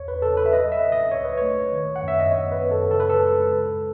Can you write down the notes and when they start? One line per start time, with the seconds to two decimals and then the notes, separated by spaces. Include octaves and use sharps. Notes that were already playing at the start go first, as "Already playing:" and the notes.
Already playing: E2 C#5
0.08 B4
0.22 C#3 A4
0.37 B4
0.46 E5
0.53 F#3 D#5
0.72 E5
0.83 C#3
0.92 D#5
1.12 C#2 C#5
1.24 B4
1.37 A3 C#5
1.72 D#3
1.96 F#5
2.02 F#2
2.08 E5
2.20 D#5
2.31 B3 C#5
2.52 B4
2.61 F#2
2.71 A4
2.91 C#3 A4
3.00 B4
3.10 A4
3.22 G#3
3.51 C#3